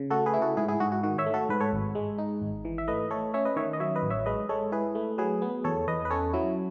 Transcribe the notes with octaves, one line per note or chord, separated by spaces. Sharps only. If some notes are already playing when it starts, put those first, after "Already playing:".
Already playing: C#3
A3 F#4 A4
G#4 B4
E4
F#4 A4
G#2 E4 G#4
E4 G#4
G#2 F#4
F#4
D#3 F#4
C#5 E5
A3
F#4 A4
G#2 B4
A4 C#5
G#1
G#3
D#4
G#1
E3
E5
A3 B4 D#5
A3 A4 C#5
C#4 C#5 E5
B4 D#5
D#3 C#5 E5
D#5
F#3 C#5 E5
B4 D#5
A1
C#5 E5
G#3 B4 D#5
G#3 A4 C#5
E4 G#4 B4
A3
F#3 G#4 B4
B3
E2 A4 C#5
E2 B4 D#5
B4
C#4 A4 C#5
F#3 E4